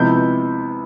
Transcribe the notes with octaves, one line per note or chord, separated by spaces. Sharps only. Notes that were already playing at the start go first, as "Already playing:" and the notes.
Already playing: C3 F3 G#3 B3 E4 G6